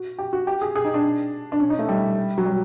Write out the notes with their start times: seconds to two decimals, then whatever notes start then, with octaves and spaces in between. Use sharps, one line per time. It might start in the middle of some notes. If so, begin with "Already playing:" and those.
Already playing: F#4
0.19 G4
0.33 F#4
0.47 G4
0.61 G#4
0.76 G#4
0.85 D#4
0.94 D4
1.52 D4
1.60 C#4
1.70 D#4
1.79 A3
1.89 G3
2.38 F#3
2.45 G3